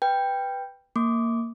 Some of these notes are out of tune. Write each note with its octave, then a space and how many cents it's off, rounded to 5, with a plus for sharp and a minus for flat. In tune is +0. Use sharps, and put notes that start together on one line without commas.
B4 +0 G5 +5
A#3 -10 D6 -20